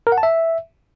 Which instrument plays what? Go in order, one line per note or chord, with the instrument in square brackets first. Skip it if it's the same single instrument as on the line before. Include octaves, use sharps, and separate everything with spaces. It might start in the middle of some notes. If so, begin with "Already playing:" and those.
[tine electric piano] A#4
F#5
A5
E5